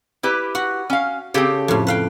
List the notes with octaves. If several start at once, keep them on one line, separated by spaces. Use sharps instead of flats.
E4 G4 B4
F#4 F#5
C#4 F5
C#3 C4 G4 A4 B5
F2 A2
B4 F5 G5